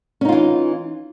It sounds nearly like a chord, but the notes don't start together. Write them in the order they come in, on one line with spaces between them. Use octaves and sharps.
C#4 D#4 F4 E3